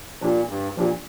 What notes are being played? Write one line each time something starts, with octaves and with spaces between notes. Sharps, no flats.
A#2 F3 D4 G4
G2
A#2 F3 D4 G4